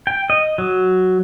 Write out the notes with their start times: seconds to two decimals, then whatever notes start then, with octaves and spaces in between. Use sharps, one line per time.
0.07 G5
0.30 D#5
0.58 F#3